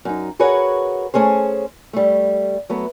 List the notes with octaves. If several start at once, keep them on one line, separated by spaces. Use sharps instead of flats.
F#2 D#4
F#4 G#4 A#4 B4 C#5 F#5
A3 C#4 G#4 C5
G3 A3
F#3 A3 B3